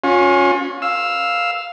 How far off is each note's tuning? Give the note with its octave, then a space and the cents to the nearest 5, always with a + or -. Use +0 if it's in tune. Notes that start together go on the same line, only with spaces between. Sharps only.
C#4 +0 F4 +40
F5 +0 E6 +0